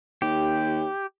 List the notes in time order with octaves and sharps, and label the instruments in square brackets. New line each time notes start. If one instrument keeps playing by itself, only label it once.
[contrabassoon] D#2 [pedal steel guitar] G4